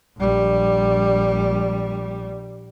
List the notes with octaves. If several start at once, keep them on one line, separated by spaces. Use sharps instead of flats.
A#1 G3